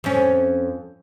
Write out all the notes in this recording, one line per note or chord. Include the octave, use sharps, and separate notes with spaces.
F2 C#4